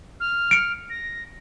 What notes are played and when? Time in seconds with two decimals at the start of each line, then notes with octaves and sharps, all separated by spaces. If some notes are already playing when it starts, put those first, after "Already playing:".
0.20 F6
0.51 C#7 D7
0.89 A#6